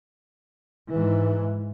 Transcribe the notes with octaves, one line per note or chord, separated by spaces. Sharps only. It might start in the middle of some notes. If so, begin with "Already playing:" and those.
G#2 E3